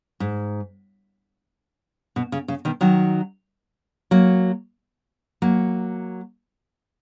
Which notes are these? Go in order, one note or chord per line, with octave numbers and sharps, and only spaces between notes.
G#2
B2
C#3
C#3
B2 D#3
D#3 F#3
F#3 A#3
F#3 A#3